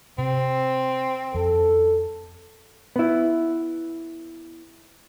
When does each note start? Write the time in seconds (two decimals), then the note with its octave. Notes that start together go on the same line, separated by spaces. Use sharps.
0.18 C3 C4
1.34 F2 A4
2.96 B3 E4